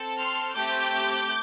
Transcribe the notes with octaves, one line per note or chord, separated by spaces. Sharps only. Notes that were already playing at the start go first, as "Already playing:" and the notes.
Already playing: C4 A4
C6 F6
A3 C4 G4 D6 G6